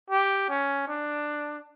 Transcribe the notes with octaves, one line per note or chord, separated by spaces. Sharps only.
G4
C#4
D4